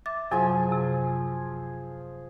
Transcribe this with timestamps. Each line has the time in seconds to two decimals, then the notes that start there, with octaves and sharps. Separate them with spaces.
0.06 E5 D6 A6
0.31 F#2 C3 F3 F#3 G#4 G#5
0.69 F#2 C3